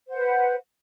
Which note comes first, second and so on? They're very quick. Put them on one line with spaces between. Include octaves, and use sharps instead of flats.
C5 F#5 B4